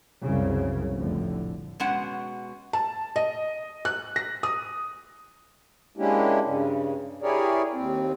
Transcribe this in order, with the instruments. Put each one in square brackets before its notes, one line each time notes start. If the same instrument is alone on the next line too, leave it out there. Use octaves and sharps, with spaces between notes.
[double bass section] C2 F#2 C#3
F1 A2 D3
[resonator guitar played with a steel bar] B2 G#3 C#4 F#5
[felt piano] A5
D#5
F#6
A#6
D#6
[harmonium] G#3 A#3 C#4 D4 E4 G4
G2 C#3
E4 G4 G#4 A#4 C#5 D5
D#2 C4